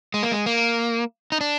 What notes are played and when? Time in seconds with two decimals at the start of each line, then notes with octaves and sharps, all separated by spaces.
0.14 G#3
0.23 A#3
0.32 G#3
0.46 A#3
1.32 D#4
1.41 D4